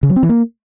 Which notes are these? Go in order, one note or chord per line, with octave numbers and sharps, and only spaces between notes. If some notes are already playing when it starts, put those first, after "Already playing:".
C#3
F#3
C4
E3
A#3